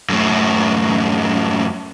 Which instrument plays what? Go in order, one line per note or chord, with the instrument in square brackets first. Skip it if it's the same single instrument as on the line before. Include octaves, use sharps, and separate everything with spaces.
[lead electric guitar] F#2 A2